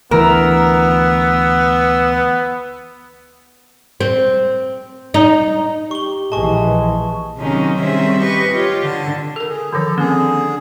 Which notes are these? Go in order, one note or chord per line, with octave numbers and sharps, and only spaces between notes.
D2 E3 B3 A#4 B4 E6
C4
D#4
G4 C#6 G7
A#1 E3 G#3 A5 C#6
C3 D#3 F#3 G#3 C#4 D#4
D#3 G3 C4 C#4 G#4 E5
G4 B4 D#5 C#6
F4 G4 C#5
D3 A5
A4 A#4
G#4
D3 D#3 F3 A4
D3 A#3 C4 C#4 G#4